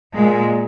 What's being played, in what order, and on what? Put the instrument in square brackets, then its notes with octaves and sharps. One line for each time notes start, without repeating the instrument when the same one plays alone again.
[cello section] A#2 G#3